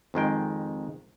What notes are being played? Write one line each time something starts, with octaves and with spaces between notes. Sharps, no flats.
F2 D#3 G#3 G5